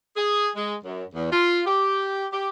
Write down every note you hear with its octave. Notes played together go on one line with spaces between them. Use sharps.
G#4
G#3
F#2
E2
F4
G4
G4